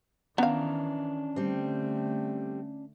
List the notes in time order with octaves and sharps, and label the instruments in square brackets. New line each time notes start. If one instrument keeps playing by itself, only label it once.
[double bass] D#3 E3 [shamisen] B3 F5 [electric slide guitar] C#4 D4 A#5
[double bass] D3 A3 [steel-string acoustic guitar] G3 C4